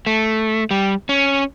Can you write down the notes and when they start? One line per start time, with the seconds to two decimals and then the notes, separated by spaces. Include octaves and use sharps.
0.06 A3
0.71 G3
1.09 C#4